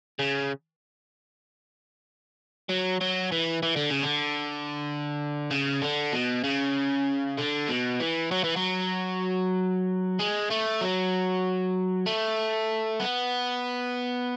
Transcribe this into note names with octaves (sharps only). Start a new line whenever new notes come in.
C#3
F#3
F#3
E3
E3
D3
C#3
D3
C#3
D3
B2
C#3
D3
B2
E3
F#3
E3
F#3
G#3
A3
F#3
A3
B3